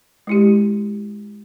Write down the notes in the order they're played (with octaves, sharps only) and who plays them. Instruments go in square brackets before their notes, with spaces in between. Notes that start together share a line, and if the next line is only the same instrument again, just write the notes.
[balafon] G#3 E4 G4